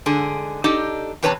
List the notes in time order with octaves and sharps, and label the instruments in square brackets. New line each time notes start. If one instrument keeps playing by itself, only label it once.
[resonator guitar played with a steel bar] G#2 D3 G#4
D4 D#4 G4 A4 D#5
E2 C3 B4 C#5 G#5 A5